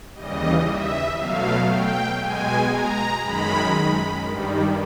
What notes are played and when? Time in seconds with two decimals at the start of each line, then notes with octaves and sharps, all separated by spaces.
0.14 D#2 C#3 E3 G3 D#5
0.66 E5
1.17 B2 F#3 A3 F5
1.68 G5
2.19 B2 G#3 G#5
2.71 A#5
3.22 F#2 D#3 G#3 B5
4.26 G2 D#3 G3